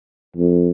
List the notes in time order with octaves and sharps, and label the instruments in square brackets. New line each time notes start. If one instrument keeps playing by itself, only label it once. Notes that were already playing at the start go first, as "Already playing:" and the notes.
[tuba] F2